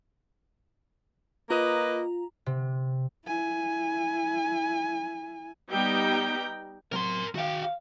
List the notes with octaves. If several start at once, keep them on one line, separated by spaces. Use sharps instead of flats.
A#3 F4 B4 D#5 A#5
C3
E4 G#5
G3 B3 D#4 G5 A#5
C3 F#3 A#4 C6
D#3 F#4 E5 F5 G5
F5